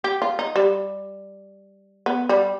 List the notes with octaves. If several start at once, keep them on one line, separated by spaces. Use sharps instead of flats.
G4
F4
D#4
G3
B3
G3